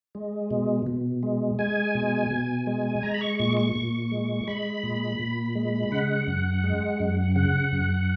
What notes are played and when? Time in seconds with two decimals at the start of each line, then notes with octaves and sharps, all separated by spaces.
0.15 G#3
0.51 B2
0.87 B2
1.23 G#3
1.59 G#3 G#5
1.95 B2
2.31 B2
2.67 G#3
3.03 G#3 A#5
3.14 B5
3.21 C#6
3.39 A#2 C#6
3.57 C#6
3.76 A#2
4.12 G#3
4.47 G#3 B5
4.83 A#2
5.20 A#2
5.55 G#3
5.92 C#3 F#5
6.27 F#2
6.64 G#3
7.00 F#2
7.36 C#3 F#5
7.72 F#2